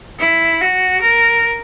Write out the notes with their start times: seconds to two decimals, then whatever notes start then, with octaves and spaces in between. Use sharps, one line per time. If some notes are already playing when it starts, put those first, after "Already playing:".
0.19 E4
0.61 F#4
1.01 A#4